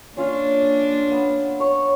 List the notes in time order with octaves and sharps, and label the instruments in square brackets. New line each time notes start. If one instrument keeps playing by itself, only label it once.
[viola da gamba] A#3 D4 [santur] C#4 F4 F5
[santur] B3
C#5 C#6